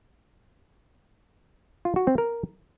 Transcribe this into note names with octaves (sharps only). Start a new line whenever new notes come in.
F4
F#4
C4
A#4